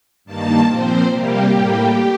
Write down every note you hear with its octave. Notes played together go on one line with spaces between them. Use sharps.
G2 D#3 A#3 A5
A#2 F3 C4 C5
C3 G3 A#3 G4
A2 G3 A#3